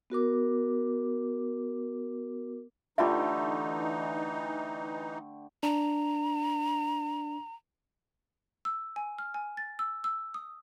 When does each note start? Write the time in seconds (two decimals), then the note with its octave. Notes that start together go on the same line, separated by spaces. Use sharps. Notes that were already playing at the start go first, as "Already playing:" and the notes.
0.10 B3 F#4 A#4 D6
2.98 D3 E3 A3 D#4 F4 G4 E5
5.63 D4 A#5
8.65 E6
8.96 G#5
9.19 F6
9.34 G#5
9.57 A6
9.79 E6
10.04 E6
10.34 D#6